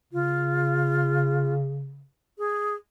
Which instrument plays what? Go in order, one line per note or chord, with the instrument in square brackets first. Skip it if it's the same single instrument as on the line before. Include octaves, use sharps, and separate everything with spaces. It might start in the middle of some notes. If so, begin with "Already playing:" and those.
[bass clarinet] C#3 [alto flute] F4
[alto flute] G#4